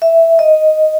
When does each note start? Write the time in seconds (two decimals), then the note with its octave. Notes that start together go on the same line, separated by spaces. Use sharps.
0.02 E5
0.39 D#5